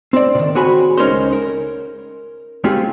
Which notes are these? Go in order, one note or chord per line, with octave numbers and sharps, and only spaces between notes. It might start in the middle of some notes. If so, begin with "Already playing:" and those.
C4 D5
C3 D#3
C4 F#4 G#4 C#5 G#5 B5
C#2 G#3 C#4 D#4 A#4 C5
A#4
G3 A3 C4 F4 G4 G#4